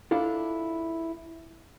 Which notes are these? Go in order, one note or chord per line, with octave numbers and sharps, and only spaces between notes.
D4 E4 F4 A4